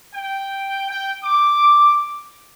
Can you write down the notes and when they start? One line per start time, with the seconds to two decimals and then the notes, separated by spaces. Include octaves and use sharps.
0.14 G5
0.90 G5
1.24 D6